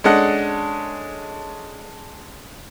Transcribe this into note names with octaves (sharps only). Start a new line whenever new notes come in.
G#3 C#4 D4 A4 D#5 F#5